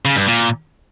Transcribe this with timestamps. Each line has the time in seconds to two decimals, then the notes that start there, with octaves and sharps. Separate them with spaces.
0.05 C#3
0.16 G2
0.27 A#2